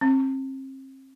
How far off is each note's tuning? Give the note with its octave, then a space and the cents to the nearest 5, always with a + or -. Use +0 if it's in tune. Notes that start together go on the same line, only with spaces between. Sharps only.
C4 +35